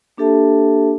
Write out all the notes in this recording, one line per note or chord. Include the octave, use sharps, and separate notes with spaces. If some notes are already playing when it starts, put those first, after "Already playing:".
A#3 D4 G4 A4 E5 A5